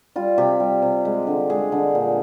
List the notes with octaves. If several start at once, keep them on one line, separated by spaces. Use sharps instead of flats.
G3 F4
C3 G4
G3
C3
G#3
D3
G#3 G#4
D3
A#2